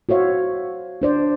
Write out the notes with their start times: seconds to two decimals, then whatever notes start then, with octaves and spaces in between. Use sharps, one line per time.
0.09 F#4 C5 C#5 E5 F5
1.02 D4 C5 D5